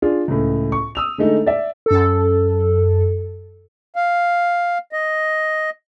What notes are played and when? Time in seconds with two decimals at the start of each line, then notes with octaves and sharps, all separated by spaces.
0.02 D4 F4 G#4
0.28 C#2 A2
0.72 C#6
0.95 D#6 E6 F7
1.18 D3 G#3 A3 D#4 A4
1.46 D5 E5
1.86 F#2 A4
3.96 F5
4.93 D#5